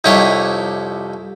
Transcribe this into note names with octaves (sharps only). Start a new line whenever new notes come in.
C2 F2 C3 D#4 E4 C#5